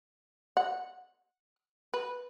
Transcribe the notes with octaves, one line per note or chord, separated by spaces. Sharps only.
F#5
B4